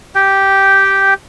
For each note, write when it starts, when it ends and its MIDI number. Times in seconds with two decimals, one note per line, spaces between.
0.15 1.14 67
0.15 1.14 79